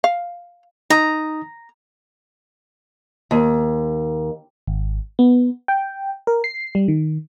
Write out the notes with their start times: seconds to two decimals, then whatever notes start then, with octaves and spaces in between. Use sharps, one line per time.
0.04 F5
0.90 D#4 A#5 D#6
3.31 D#2
4.67 G#1
5.19 B3
5.68 G5
6.27 A#4
6.44 C7
6.75 G3
6.88 D#3